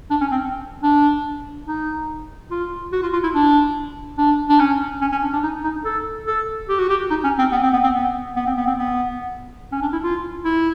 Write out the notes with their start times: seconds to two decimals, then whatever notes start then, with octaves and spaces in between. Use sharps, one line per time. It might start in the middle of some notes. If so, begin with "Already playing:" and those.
0.11 D4
0.21 C#4
0.31 C4
0.83 D4
1.67 D#4
2.51 F4
2.93 F#4
3.03 F4
3.13 F4
3.24 E4
3.34 D4
4.18 D4
4.49 D4
4.60 C#4
5.01 C#4
5.12 C#4
5.22 D4
5.33 D4
5.43 D#4
5.64 D#4
5.85 A4
6.27 A4
6.69 G4
6.79 F#4
6.90 G4
7.10 D#4
7.24 C#4
7.38 C4
7.52 B3
7.63 C4
7.73 B3
7.83 C4
7.94 B3
8.36 B3
8.46 C4
8.57 B3
8.67 C4
8.78 B3
9.72 C#4
9.82 D4
9.93 E4
10.03 F4
10.45 E4